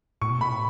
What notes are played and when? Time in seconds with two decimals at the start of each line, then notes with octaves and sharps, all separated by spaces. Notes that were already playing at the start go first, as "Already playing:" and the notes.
0.21 A2 C#6
0.30 B2
0.40 A2 B5